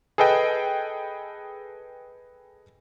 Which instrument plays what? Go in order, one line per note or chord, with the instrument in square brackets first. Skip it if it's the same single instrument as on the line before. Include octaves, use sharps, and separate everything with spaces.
[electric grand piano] G#4 A4 B4 D#5 G5